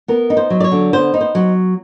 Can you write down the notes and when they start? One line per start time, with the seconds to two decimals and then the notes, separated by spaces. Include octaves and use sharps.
0.08 B3 A#4
0.30 D#4
0.37 C5
0.50 F#3
0.60 D5
0.64 C#5
0.72 D3
0.93 B3 C5
1.14 D#4
1.21 C5
1.35 F#3